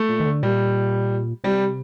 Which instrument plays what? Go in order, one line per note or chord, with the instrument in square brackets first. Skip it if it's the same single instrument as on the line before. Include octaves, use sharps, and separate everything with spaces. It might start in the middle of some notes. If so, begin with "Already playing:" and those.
Already playing: [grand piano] A3
[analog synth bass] A#2
D#3
D3
[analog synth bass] A#2 [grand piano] G3
[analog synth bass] C3 [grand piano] G3